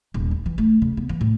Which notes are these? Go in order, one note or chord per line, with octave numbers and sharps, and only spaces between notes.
D#1
D#4
E3
A3
C#3
B3
E3
A2